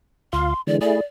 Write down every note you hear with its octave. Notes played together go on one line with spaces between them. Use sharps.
D2 F4 F5 C6
D3 E3 G#3 D5
A3 E4 G#4 D5